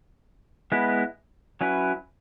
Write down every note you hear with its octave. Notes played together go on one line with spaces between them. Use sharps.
G#3 B3 E4 B4
F#3 C#4 E4 B4